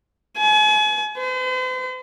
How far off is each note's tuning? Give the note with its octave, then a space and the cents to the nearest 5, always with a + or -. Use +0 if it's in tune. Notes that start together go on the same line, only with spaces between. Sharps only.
G#5 +40
C5 -45